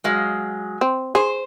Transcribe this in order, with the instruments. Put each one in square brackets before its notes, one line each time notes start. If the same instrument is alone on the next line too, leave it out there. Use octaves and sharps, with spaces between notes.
[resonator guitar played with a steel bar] F#3 G#3 F5
[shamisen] C4
[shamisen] G#4 [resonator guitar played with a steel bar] C5